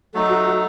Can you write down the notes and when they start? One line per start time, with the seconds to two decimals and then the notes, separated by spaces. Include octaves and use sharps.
0.14 F#3 A3 D#4 A4
0.29 F#4
0.45 F#4